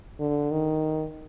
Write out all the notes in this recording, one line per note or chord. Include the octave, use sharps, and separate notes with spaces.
D3
D#3